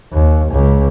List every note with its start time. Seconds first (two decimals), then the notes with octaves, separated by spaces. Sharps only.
0.13 D#2
0.52 C#2